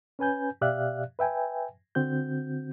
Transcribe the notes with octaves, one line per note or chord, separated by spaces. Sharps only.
C#4 B4 G#5 G6
B2 G4 D5 E5 F5 F#6
B4 E5 G5 G#5
D3 C4 F#4 G6